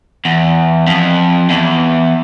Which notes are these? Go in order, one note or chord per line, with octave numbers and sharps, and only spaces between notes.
E2
F2
E2